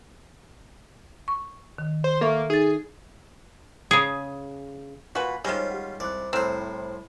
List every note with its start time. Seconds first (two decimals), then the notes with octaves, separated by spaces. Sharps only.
1.28 C#6
1.78 D#3
2.04 C5
2.21 A#3 A4 E5 C#6
2.50 D#4 G#4 A6
3.91 C#3 G#4
5.15 A#2 F#4 B4 G#5
5.45 D#3 G3 G#3 C#4 F4 G4 C5 C#5
5.71 G4 F#5
6.00 C2 C5 D5 D6 F#6
6.33 C2 A2 C4 C5 A#5 F6 F#6